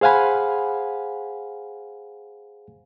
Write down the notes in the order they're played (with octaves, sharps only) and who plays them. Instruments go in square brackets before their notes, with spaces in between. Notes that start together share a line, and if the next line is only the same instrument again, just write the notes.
[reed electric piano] G#4 C5 F5 F#5 G#5 B5